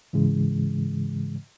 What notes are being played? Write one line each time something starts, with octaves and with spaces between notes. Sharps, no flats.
G#2 C#3 E3 G#3